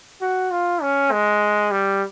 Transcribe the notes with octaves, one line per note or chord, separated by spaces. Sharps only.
F#4
F4
C#4
G#3
G3